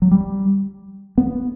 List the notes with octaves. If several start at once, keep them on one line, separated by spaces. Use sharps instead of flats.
F#3
G3
B3